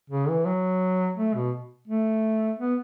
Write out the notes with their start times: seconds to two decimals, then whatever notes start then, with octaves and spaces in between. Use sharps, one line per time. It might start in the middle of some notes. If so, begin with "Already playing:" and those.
0.10 C#3
0.29 E3
0.46 F#3
1.17 A3
1.35 B2
1.88 A3
2.59 B3